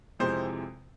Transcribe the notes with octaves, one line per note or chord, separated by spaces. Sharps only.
F2 C3 E3 G#3 C5